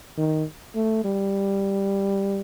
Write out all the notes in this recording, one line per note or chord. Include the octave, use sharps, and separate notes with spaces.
D#3
A3
G3